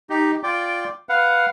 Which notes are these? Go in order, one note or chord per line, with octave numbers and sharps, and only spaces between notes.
D#4 G4
F4 D5 G5 D6
B4 F5 F#5